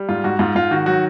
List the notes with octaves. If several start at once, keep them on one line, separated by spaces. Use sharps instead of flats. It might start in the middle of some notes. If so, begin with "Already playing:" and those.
Already playing: G3
G#2 F4
G#2 F#4
G#2 F4
G#2 F4
D#3 F#4
F#3 F#4